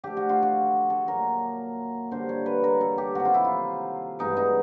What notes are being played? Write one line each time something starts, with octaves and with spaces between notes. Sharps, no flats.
D3 F3 A3 G4
F#4
F4
F#4
A4
A#2 F#3 A#3 A#4
D3 G3 A#3 C5
C#5
B4
A#4
A4
G4
C3 D#3 F#3 F#4
F4
E4
F4
G2 E3 G#3 B3 D#4
D#4